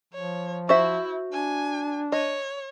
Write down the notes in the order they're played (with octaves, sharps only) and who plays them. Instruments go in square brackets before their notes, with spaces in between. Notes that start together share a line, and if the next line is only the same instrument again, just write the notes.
[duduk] F3 [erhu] C#5
[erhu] E4 [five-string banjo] F#4 C5 E5
[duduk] D4 [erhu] G#5
[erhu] C#5 [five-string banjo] D#5